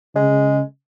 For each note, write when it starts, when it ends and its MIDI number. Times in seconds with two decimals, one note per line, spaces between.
0.16 0.62 49
0.16 0.60 56